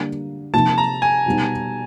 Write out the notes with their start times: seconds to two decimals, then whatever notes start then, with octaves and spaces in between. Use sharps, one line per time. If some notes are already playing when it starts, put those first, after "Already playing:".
Already playing: D3 G3 A#3
0.53 C3 F3 A#3 D#4 A5
0.78 A#5
1.02 G#5
1.26 B2 G3 B3 D#4